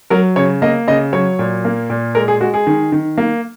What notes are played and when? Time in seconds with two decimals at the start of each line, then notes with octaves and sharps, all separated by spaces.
0.10 F#3 A#4
0.36 C#3 C#5
0.62 A#3 D#5
0.87 C#3 D#5
1.13 F#3 C#5
1.39 A#2
1.65 A#3
1.90 A#2
2.15 G#3 A#4
2.28 G#4
2.40 G#3 F#4
2.54 G#4
2.67 D#3
2.92 D#3
3.18 A#3